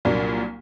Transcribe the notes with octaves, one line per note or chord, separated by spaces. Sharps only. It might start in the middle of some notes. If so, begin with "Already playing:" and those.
C2 A#2 F#3 A#3 D4